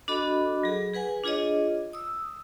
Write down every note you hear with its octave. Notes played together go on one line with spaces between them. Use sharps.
D4 F#4 A4 D#5 B5 D6
F#3 G#4
G#4 B4 F#5 G#5
D4 F4 G#4 C#5 D#5
D#6 E6